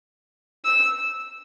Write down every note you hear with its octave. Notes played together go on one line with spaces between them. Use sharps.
E6